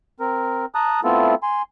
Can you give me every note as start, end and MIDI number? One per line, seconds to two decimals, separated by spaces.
0.20 0.66 60
0.20 0.66 70
0.75 1.00 81
0.75 1.00 82
0.75 1.00 87
0.75 1.00 90
1.04 1.35 57
1.04 1.35 59
1.04 1.35 60
1.04 1.35 64
1.04 1.35 65
1.04 1.35 69
1.43 1.62 80
1.43 1.62 84